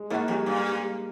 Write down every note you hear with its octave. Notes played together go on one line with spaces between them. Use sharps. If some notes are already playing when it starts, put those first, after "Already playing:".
Already playing: G#3
G#2 A#3
F2 G3
G2